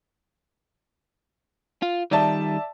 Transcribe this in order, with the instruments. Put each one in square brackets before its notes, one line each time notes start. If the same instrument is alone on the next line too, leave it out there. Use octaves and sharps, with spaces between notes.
[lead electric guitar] F4
[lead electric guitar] D#3 G3 [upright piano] D5 E5 A5